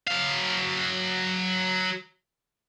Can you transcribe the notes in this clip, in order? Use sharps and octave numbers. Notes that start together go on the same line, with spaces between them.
F#3 F5